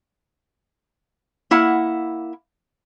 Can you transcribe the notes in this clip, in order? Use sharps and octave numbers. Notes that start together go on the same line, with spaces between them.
A#3 E4 F#5